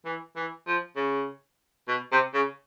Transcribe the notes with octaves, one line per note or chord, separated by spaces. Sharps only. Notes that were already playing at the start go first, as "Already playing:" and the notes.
E3
E3
F3
C#3
B2
C3
C#3